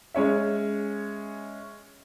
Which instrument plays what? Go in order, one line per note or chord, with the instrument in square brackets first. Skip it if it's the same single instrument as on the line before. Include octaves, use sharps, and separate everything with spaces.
[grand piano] G#3 C#4 C#5 E5